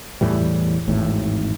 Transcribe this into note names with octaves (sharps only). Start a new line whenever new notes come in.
E2 A2 E3 G3
G#1 E2 A2